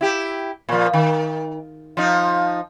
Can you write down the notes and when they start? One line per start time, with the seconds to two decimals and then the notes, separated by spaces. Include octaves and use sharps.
0.01 E4 G4
0.69 A#2 F3
0.93 D#3
1.97 F3 D#4